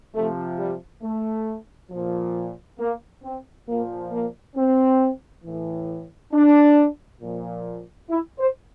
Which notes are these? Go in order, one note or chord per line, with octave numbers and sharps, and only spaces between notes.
C3 F3 A3
G3
A3
A#2 F3
A#3
C4
A#2 F3 A#3
A#3
C4
A2 E3
D4
A#2 F3
E4
C5